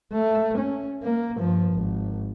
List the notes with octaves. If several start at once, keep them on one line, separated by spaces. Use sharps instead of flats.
A3
C#4
A#3
G2 F3
G#1